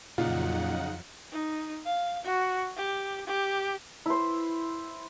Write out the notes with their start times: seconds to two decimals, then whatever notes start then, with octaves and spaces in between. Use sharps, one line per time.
0.18 F2 A#2 C#3 F#3 D#4 F4 F#5
1.32 D#4
1.85 F5
2.25 F#4
2.77 G4
3.27 G4
4.06 E4 C5